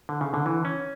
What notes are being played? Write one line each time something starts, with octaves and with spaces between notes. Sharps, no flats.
D3
C#3
D3
E3
C#4